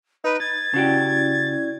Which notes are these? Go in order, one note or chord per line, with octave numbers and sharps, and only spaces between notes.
D#4 B4
G#6 A6
C#3 C#4 E4 F#4 G4 D5